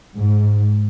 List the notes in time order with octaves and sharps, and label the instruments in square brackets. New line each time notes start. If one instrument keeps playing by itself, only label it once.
[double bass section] G#2